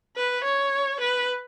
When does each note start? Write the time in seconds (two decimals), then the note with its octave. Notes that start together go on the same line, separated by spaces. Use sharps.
0.16 B4
0.44 C#5
1.00 B4